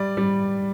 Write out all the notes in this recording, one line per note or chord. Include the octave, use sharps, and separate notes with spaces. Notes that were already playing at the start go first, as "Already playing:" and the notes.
Already playing: G3 D5
G3